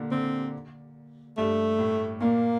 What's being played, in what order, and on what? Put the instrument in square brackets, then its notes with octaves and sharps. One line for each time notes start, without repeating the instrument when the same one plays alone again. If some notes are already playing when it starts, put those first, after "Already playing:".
Already playing: [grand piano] A#2 D3
[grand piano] D3 [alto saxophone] C4
[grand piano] G2 [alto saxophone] A3
[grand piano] A2
[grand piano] A#2 [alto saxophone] A#3